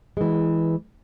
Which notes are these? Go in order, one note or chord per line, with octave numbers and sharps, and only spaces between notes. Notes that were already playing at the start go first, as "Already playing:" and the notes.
E3 G#3